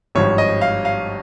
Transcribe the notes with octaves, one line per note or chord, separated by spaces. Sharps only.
G#1 G2 F3 C#5
D#5
F5
F5